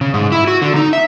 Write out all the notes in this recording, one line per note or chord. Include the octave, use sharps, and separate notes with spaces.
C#3
G#2
E4
F#4
D3
D#4
E5